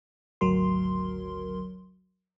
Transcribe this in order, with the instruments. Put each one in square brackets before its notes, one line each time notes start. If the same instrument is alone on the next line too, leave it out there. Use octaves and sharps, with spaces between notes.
[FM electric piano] G#1 D2 F#3 A#4 C6